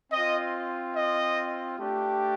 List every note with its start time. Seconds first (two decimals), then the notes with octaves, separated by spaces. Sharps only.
0.11 C4 F4 D#5
0.95 D#5
1.79 A3 D4 G4